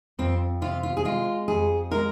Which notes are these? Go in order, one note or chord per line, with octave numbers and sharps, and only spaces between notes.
F2 C4
C3 F4
F4
G#4
G#3 F4
F2 G#4
G#3 A#4